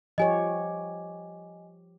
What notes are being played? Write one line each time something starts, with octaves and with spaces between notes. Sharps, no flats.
F3 G4 C#5 D#5 G#5